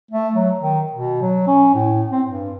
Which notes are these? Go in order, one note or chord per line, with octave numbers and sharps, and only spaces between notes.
A3
F#3
D#3
B2
F#3
C#4
A2
C4
G2